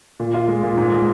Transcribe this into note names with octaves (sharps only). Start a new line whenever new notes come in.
A#2
F4
G#3
A#2
G#2
G#3